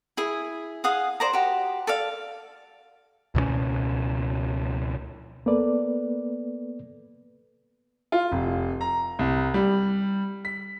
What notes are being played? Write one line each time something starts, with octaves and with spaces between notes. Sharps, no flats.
E4 G#4
G#4 F5 F#5 D#6
C5 D5 A#5
F#4 G4
A4 D5 F5
C#2 B2 F3 C#4
A#3 B3 A4 B4 D5
F4
F1
A#5
C2
G3
B6